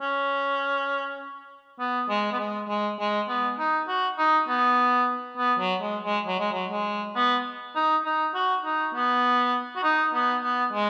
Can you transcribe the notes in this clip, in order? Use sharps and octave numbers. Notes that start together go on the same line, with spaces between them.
C#4
B3
G#3
B3
G#3
G#3
G#3
B3
D#4
F#4
D#4
B3
B3
F#3
G#3
G#3
F#3
G#3
F#3
G#3
B3
D#4
D#4
F#4
D#4
B3
F#4
D#4
B3
B3
G#3